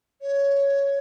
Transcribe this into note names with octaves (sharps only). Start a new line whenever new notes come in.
C#5